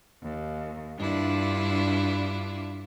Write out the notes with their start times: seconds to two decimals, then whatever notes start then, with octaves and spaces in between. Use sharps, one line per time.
0.22 D#2
0.98 G2 D4 E4 F4